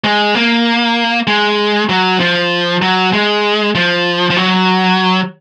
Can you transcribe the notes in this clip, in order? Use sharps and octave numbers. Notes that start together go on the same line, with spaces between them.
G#3
A#3
G#3
F#3
F3
F#3
G#3
F3
F3
F#3